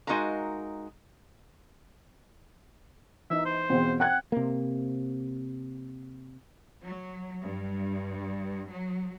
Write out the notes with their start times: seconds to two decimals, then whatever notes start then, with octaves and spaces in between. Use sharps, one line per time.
0.07 G#3 D#4 F#4 A#4 F5 A#5
3.30 E3 D#4 E5
3.45 C5
3.70 E2 B2 C4 F4
4.00 F#5 G5 F#6 G#6
4.32 C3 A#3
6.83 F#3
7.44 G2
8.72 F#3